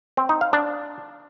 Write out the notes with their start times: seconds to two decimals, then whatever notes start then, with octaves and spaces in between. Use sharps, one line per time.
0.17 C4
0.29 D#4
0.41 F5
0.53 D4